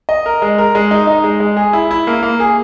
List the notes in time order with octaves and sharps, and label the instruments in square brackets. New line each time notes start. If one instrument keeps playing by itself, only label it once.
[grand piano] D#5
A#4
G#3
A#4
G#3
D#4
D#4
G#3
G#3
G#4
E4
E4
A#3
A#3
G#4